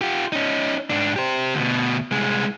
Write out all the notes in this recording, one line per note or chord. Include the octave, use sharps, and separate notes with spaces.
F4 G4
C#4 D#4
G#2 D4
G4 C5
D2 B2
C2 G#3